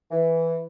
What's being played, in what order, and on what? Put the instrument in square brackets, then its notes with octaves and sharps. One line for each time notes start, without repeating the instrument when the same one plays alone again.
[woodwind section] E3